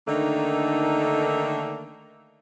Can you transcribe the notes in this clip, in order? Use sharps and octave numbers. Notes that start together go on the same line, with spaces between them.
D3 D#3 A3 A#3 D4 D#4